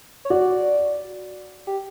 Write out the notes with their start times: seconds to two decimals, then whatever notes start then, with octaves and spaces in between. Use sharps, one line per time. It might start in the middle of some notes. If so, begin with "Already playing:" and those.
0.25 C#5
0.30 F#4 D5
1.67 G4